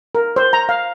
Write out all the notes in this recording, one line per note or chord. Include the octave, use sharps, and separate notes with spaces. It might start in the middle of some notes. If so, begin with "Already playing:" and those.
A#4
C5
A#5
F5